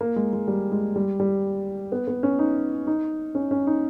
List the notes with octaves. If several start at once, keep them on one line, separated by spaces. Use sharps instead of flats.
A#3
G#3
G#3
G3
G#3
G3
G3
B3
B3
C#4
D#4
D#4
C#4
C#4
D#4